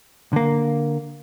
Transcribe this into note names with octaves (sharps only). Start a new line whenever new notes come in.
D3 A#3